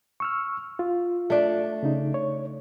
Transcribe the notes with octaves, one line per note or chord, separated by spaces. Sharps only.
C#6 E6 F6
F4
A3 D4
C#3 D#4
C#5